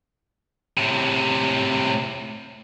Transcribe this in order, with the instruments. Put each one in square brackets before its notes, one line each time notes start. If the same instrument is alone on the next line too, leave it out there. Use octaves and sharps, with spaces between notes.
[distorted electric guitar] A2 C3